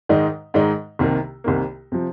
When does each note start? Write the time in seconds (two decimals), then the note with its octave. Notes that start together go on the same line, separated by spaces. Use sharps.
0.09 G#2 D#3 G#3 D#4
0.54 G#2 D#3 G#3 D#4
0.99 C2 C3 D#3 A#3
1.44 C2 C3 D#3 A#3
1.92 C3 F3